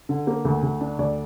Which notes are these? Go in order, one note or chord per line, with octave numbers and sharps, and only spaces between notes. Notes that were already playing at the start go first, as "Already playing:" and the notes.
D3
A#3
D2
D2
D4
D2 D5